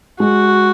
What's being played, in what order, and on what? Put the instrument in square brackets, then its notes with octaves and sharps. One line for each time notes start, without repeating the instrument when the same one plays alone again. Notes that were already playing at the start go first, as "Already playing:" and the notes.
[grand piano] G#3 [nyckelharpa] F#4